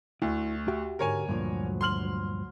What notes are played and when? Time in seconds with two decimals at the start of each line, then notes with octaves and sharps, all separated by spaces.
0.22 D2 E4
0.68 F#4 G4 E5
0.99 G#2 D3 A#4 C#5 G#5
1.29 D2 G2 A#2 F3 F#3
1.81 C6 F6 F#7